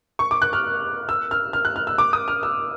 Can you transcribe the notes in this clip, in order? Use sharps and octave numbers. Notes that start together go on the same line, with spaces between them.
C#6
D6
F#6
F6
E6
F6
F6
F#6
F6
E6
D6
D#6
F6
E6